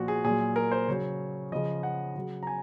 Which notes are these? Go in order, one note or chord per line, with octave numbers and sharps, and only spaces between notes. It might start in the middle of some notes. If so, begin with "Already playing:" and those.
Already playing: A#2 F3 F#4
G#4
A#2 F#3 G#4
A#4
C5
C#3 F#3 C#5
C#3 F3 D#5
F#5
C#3 F#3
A#5
G#5